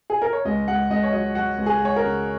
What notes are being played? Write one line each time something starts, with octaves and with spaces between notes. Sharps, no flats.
G#4
A#4
C#5
C#2 D#5
C#2 F#5
C#2 D#5
C#5
F#3 D#5
F#3 F#4
C#2
G#4
C#2 C#5
A#4
C#3